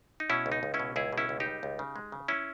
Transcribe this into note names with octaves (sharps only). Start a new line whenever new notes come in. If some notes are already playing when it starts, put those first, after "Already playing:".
D#4
B2 C#4 E4
C#2
D#4
C#2
C#4 E4
B2
C#2 E4 G#4
B2
C#4 E4
C#2
D#4 G4
G3
C#2
C#3
G#3
C#3
C#4 E4